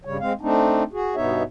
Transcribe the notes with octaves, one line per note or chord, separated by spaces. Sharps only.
G2 C#3 G3 C#5
G#3 C4 F5
A3 C4 D4 D#4
F#4 G#4
G2 B2 B3 D#4 C#5 E5